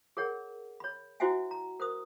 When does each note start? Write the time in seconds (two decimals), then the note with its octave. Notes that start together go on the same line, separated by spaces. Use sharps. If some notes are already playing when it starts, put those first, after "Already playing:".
0.17 G#4 A#4 C#5 F#5
0.80 C#5 B5
1.20 E4 F#4 C5 E5 F#5 G#5
1.51 A#5
1.80 A#4 C5 D#6